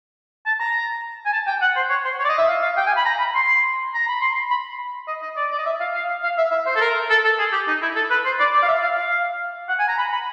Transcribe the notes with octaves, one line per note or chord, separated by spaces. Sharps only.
A5
A#5
G#5
A5
G5
F#5
C5
C#5
C5
C#5
D5
D#5
E5
F5
F5
G5
G#5
B5
A#5
B5
C6
A#5
B5
C6
B5
D#5
D#5
D5
D5
D#5
E5
F5
F5
F5
E5
E5
C5
A4
A#4
A4
A4
G#4
G4
D#4
E4
A4
B4
C5
D5
D5
F5
E5
F5
F5
F#5
G#5
A#5
B5
B5